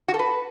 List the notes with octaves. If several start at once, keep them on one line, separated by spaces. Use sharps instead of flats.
F#4
A4
B4